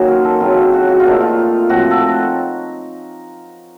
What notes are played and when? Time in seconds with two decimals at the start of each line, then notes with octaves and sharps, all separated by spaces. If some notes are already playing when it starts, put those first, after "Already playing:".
Already playing: D#3 F#3 A#3 C#4 C5 D#5
0.08 A#4
0.25 A4
0.40 C#3 F#3 C4 F4
0.56 A4
0.74 F#4
0.88 F#4
1.00 F4
1.06 A#2 A3 C4 D#4
1.21 F4
1.69 A2 F3 C4 F#4
1.91 A4